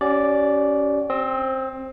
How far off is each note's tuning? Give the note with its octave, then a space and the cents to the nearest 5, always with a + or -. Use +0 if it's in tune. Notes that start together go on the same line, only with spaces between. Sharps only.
C#4 +15 G4 -35 D5 +0
C4 +15 E6 -40